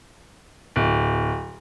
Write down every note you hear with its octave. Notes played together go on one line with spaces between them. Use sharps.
D1